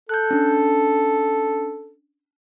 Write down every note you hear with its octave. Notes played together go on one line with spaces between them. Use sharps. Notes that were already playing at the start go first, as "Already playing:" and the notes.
A4 F#6 G6
C#4 D4